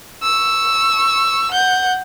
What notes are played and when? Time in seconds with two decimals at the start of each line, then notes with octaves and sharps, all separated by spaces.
0.23 C#6 E6
1.51 F#5 G6